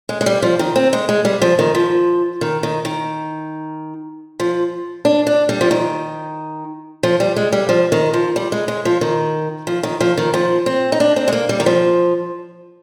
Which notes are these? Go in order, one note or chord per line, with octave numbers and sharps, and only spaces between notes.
G#3
G#3
G3
F3
D#3
C4
G#3
G#3
G3
F3
D#3
F3
D#3
D#3
D#3
F3
D4
D4
G3
F3
D#3
F3
G3
G#3
G3
F3
D#3
F3
G3
G#3
G#3
F3
D#3
F3
D#3
F3
D#3
F3
C4
D#4
D4
C4
G#3
A#3
G3
D#3
F3